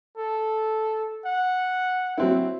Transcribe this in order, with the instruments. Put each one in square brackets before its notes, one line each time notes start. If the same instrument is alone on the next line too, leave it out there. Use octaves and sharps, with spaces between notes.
[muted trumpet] A4
F#5
[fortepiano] F#3 C4 E4